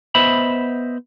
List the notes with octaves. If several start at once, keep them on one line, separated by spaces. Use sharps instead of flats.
B3 C5 D#5 E5 B5